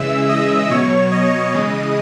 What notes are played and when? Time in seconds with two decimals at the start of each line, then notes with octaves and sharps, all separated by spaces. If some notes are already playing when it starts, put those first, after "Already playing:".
Already playing: C#3 E3 G#3 E5 E6
0.29 D#5 D#6
0.70 B2 F#3 C#5 C#6
1.12 D#5 D#6
1.54 C#3 E3 G#3